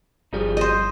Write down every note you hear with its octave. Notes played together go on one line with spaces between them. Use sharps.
G1 F3 G3 D#4 G#4
C5 D#5